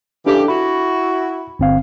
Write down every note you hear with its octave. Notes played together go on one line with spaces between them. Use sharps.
C#3 E3 D4 G4 A4
E4 F#4 B5
G1 C4 F5